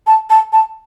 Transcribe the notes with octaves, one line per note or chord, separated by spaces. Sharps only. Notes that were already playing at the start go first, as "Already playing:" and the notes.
A5
A5
A5